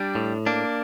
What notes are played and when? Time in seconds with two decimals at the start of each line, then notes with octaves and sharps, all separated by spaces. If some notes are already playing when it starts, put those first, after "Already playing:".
Already playing: G3 D4
0.15 A2
0.46 A#3 D4